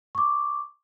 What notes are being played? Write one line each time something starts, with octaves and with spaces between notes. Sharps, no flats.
C#6 D6